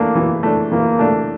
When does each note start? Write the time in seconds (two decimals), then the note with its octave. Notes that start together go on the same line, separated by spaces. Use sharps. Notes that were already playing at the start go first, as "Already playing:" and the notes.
Already playing: E3 A3 A#3 D4
0.15 E3
0.43 A3 D4
0.72 E3 A#3
0.99 A3 D4